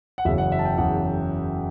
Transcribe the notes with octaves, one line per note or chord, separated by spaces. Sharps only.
F#5
F#1 E2 C#3 F#3 E5
F#5
E5
A5
G5
F#1 E2 C#3 F#3 F#5